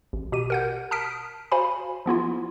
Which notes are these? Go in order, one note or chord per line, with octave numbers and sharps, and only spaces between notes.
A1
B2 G4 D#7
A#4 F#5 G6
A5 D#6 F6 B6 D7
F#4 C5 F5 G#5 B5
F3 B3 E4 F4